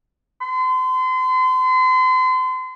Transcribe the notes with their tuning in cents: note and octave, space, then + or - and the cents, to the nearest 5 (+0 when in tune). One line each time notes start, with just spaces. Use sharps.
C6 -35